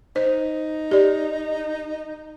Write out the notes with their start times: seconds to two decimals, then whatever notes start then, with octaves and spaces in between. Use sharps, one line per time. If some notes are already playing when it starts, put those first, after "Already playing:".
0.16 D#4 C5
0.91 G4 D5